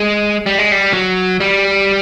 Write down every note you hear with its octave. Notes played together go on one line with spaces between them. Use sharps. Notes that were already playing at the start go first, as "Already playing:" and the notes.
Already playing: G#3
G3
G#3
G3
F#3
G3